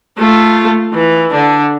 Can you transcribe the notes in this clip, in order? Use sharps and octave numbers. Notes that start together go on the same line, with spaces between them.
A3 F4
E3
D3 D4